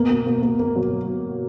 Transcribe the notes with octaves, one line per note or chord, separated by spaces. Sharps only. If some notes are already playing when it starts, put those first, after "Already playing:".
Already playing: B2 A#3
A#3
A#3
A#3
A#3
F#3